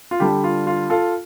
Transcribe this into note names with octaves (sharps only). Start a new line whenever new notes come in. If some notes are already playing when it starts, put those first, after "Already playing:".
F4
D3 G3 D4 G4
F4
F4
F4 A4